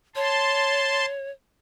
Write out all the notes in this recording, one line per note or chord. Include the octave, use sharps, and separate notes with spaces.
C#5 A5 C6